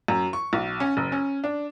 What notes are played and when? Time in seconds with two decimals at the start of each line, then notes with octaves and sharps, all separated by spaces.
0.08 F#2
0.33 C#6
0.53 B1
0.80 C#4
0.97 F#1
1.12 C#4
1.44 D4